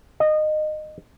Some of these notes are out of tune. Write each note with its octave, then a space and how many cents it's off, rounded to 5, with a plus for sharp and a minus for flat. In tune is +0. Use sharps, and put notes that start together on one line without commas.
D#5 -20